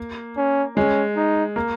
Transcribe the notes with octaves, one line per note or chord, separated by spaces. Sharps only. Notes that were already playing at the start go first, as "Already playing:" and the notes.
Already playing: A#3
C#4
G#3 C#4
D#4
A#3